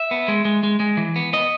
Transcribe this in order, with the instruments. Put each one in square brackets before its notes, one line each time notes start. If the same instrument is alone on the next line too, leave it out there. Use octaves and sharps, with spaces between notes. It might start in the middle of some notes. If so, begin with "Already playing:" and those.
Already playing: [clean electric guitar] E5
B3
G#3
G#3
G#3
G#3
E3
B3
B3 D#5